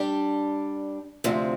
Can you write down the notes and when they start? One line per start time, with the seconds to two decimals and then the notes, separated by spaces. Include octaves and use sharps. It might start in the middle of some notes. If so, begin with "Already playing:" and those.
Already playing: G3 D4 G4
1.24 D2 C3 F3 C4